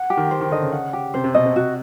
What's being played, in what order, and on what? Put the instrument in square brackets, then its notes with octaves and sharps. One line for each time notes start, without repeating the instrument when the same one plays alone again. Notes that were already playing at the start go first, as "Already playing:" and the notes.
Already playing: [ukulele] F#5
G4
[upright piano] D#3
[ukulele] C5
[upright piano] D#3
[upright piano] D3 [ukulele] D#5
[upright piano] C#3
[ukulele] F#5
G4
[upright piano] C3 [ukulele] C5
[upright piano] C3
[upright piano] B2 [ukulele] D#5
[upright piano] C3
[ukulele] F#4